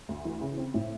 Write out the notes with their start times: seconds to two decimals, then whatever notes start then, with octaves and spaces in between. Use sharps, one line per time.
0.09 D2
0.25 E3
0.41 C#3
0.58 C4
0.74 A2